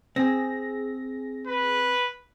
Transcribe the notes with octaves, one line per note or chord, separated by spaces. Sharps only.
C4 G#4 A#6
B4